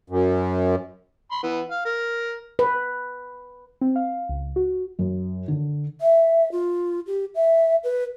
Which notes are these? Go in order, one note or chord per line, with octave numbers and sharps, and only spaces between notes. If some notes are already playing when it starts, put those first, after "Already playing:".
F#2
B5 C6
E3 B3
F5
A#4
B4
C4
F5
C#2
F#4
F#2
D3
E5
F4
G4
E5
B4